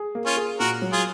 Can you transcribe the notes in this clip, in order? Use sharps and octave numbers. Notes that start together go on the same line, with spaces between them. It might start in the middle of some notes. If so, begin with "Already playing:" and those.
Already playing: G#4
A#3
C#4 F4
G#4
A#2 F#4 A#4
F#3
F4 G#4